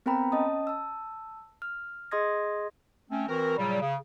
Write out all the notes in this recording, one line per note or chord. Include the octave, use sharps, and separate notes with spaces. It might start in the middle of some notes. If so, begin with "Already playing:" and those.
B3 C4 A#4 G5 A#5 B5
C#4 D#5 A5 D#6
A5 E6
F6
G#4 D#5 C6 D#6 G#6 A#6
A3 C4 C#4
E3 C4 F#4 A#4
A#2 C#3 F#3 G3
C#3